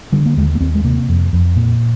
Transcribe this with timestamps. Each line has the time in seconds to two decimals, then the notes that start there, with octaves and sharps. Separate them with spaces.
0.12 D3 G3
0.26 A#3
0.37 D#2 G#3
0.55 A#3
0.60 D#2 C4
0.75 G#3
0.85 C3 A#3
1.09 F2
1.33 F2
1.56 A#2